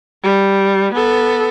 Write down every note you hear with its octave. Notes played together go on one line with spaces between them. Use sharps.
G3
B3 A4